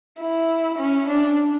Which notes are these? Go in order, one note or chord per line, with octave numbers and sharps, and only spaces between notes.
E4
C#4
D4